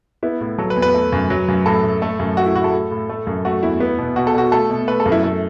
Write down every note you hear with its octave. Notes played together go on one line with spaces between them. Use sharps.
B3 E4
A2
F#3 A4
B4
E2
B4
A3
F#2
F#3
F#2
A2 A4
A2
A3
F#2
A3 F#4
E4
A2 F#4
A4
A2
A2
A3
F#2
A3 F#4
E2 E4
B3
B2
B2 F#4
A4
B2 F#4
A3 A4
B2
A3 B4
A4
F#2
E4
A3